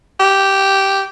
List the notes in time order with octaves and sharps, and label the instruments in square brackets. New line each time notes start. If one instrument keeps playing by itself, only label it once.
[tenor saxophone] G4